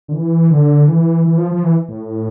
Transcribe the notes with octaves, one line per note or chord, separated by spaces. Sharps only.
D3
E3
D3
E3
E3
F3
F3
E3
A2